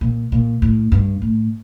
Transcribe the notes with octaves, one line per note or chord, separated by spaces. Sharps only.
A#2
A#2
A2
G2
A2